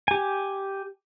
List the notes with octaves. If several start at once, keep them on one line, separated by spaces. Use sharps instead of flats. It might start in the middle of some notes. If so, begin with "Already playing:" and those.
G4 G#5